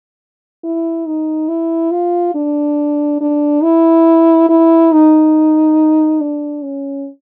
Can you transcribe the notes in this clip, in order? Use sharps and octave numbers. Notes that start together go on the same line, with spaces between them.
E4
D#4
E4
F4
D4
D4
E4
E4
D#4
D4
C#4